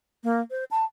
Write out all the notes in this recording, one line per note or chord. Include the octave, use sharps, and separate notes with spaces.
A#3
C5
A5